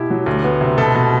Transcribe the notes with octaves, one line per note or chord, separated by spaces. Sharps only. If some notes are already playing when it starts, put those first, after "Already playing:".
Already playing: B2 E4 G4
F#3
D2
B3
C3
B2 A4
B2